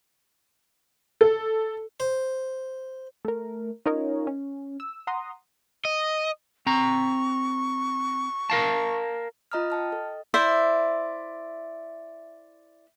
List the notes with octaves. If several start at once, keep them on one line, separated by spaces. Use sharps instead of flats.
A4
C5
A3 A#4
C#4 D#4 F4 A#4 C#5 D#5
C#4
E6
F#5 A#5 C6 D#6
D#5
C4 A#5 C#6
A#4 F5 A5
F4 D#5 A#5 D#6 F6
G5 A5 F6
A4 D#5
E4 C5 D5 E5